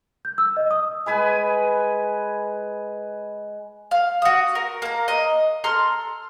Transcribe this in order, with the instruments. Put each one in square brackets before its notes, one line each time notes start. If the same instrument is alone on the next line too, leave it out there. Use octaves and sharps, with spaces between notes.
[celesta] G6
E6
D#5
D#6
[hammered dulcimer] G#3 B4 G#5 B5
[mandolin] F5
F#4 D#6
A#4
A#3 A#5
D#5
A4 A#5 C6 F6